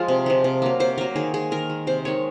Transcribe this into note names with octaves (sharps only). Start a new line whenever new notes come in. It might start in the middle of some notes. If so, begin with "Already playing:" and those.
Already playing: F3 G#3 F4
C3
F3 G#3
C3
F#3 A#3
C3 C5
F#3 A#3 A#4
D#3 G#4
G#3 G#4
D#3 A#4
G#3
C3 C5
D#3 G#3 C#5